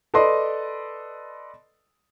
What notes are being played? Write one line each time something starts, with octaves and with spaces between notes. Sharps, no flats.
A4 B4 D5 D#5 C6